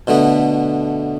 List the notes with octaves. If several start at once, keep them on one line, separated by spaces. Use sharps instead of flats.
B2 D3 A3 B3